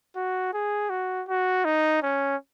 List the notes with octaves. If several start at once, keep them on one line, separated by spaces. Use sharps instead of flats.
F#4
G#4
F#4
F#4
D#4
C#4